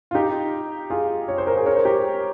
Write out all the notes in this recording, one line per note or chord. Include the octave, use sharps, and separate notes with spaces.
F4
D#4 G4
F4 G#4
C#5
C5
A#4
G#4 C5
A#4 C#5
C5
G4 A#4